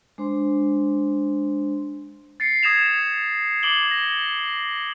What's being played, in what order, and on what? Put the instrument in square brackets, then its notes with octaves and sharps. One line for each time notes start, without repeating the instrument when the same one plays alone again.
[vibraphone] G#3 D4 C5 C6
[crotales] A6 C7 C#7
D#6 G#6 A#6 E7 F7
D6 D7 F#7 G7
A#6